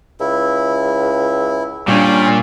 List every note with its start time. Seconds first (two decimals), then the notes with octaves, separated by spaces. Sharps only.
0.20 C#2 E4
1.88 A#2 G3 C#4 D4 D5 G5